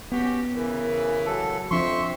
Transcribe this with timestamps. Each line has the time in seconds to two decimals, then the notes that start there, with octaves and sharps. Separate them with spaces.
0.12 B3 C#4 F#4 G4
0.54 C#3 E3 A#4
1.26 F#3 A4
1.71 F2 F3 C4 D4 E5 C6 C#6